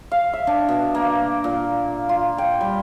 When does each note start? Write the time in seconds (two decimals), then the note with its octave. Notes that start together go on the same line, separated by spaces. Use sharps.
0.12 F5
0.33 E5
0.47 D4
0.69 B2
0.95 A#3
1.44 A#2
2.09 F4
2.38 G5
2.61 G3